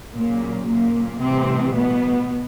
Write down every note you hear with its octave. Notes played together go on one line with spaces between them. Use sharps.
A#2 C#3 F#3 A#3
A#2 A#3
A2 C3 E3 G3 C4
B2 B3